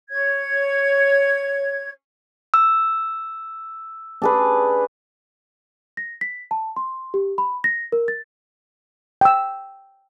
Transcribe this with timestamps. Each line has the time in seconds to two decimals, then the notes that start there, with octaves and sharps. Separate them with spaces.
0.11 C#5 G#6
2.54 E6
4.22 D4 G#4 B4
5.97 A#6
6.21 B6
6.51 A5
6.76 C6
7.14 G4
7.38 B5
7.64 A#6
7.92 A#4
8.08 A6
9.21 G5 E6